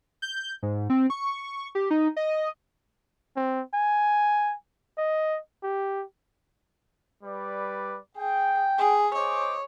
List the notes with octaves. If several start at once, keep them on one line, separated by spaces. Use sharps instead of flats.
G6
G#2
C4
C#6
G4
D#4
D#5
C4
G#5
D#5
G4
G3 B4 D5
G#4 G5
G#4
C5 C#5 D#5 D6